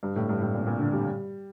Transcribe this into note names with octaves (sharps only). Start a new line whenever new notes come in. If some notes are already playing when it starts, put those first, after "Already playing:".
G2
A2
G2
A2
A#2
A#2
D3
G3